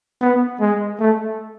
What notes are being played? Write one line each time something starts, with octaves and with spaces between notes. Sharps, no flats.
B3
G#3
A3